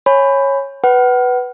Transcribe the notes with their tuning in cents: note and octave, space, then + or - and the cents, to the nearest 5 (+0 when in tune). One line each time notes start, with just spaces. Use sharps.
C#5 -15 G#5 +0 B5 +15
B4 +0 F#5 +30